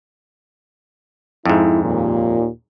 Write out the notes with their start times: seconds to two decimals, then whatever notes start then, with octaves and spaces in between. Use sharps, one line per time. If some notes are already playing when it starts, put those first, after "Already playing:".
1.46 F2 G#2 E4
1.83 D#2 A#2